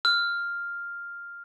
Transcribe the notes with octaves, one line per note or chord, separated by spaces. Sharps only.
F6